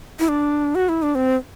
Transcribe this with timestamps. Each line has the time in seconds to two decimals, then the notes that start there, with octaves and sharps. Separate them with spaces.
0.19 E4
0.28 D4
0.75 F#4
0.89 E4
1.03 D4
1.15 C4